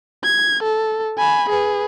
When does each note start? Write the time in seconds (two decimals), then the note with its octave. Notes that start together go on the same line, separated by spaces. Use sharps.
0.24 G#6
0.63 A4
1.18 G#5 B5
1.50 G#4 B4